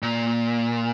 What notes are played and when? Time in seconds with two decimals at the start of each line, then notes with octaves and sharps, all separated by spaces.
0.02 A#2